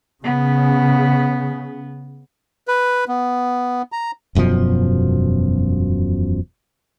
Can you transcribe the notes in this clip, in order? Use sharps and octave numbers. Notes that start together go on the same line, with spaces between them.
C#3 B3
B4
B3
A#5
E1 F#2 B2 F3